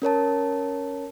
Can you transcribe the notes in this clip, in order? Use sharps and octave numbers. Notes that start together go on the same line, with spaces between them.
C#4 A#4 C#5 A5